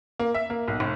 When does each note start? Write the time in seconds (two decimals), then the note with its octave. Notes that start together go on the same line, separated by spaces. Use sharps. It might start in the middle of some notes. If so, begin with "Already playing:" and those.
0.19 A#3
0.34 E5
0.50 A#3
0.68 B1
0.80 F1